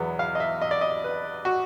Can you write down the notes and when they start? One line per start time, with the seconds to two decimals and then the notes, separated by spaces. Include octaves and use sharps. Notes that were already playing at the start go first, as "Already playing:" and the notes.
Already playing: E2 B2 F#3 B3
0.19 F5
0.35 D#5
0.40 E5
0.61 D#5
0.71 D5
0.81 D#5
1.04 B4
1.45 F#4